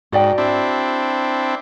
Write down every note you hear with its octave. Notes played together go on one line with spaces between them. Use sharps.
G#2 F#4 D5 G5
C4 D4 E4